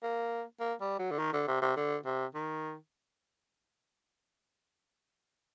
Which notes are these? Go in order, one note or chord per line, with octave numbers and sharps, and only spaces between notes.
A#3
A#3
G3
F#3
D3
D#3
D3
C3
C3
D3
C3
D#3